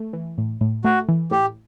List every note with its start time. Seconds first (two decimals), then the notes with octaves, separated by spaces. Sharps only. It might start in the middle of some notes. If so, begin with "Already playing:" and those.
Already playing: A3
0.13 E3
0.38 A2
0.61 A2
0.84 A3 F#4
1.09 E3
1.31 A2 G4